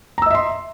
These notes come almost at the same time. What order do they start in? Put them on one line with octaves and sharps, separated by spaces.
A#5 E6 D#5 E5 C6